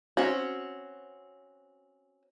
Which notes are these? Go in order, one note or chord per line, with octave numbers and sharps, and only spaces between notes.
C4 C#4 F#4